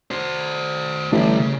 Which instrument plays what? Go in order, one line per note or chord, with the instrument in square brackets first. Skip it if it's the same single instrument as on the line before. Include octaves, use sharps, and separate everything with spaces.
[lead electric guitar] F#4 C5
[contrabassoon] A1 [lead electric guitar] D3 G3
[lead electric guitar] C#3